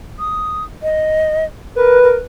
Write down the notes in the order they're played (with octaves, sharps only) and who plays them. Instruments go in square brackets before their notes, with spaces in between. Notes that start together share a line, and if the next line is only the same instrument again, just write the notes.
[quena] D#6
D#5
[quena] A#4 [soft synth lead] B4
[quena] A#4